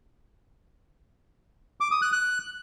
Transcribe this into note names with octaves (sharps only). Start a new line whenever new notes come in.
D6
D#6
F#6
F#6